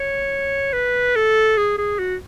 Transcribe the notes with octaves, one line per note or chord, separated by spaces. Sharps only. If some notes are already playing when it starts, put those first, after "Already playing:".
Already playing: C#5
B4
A4
G#4
G#4
F#4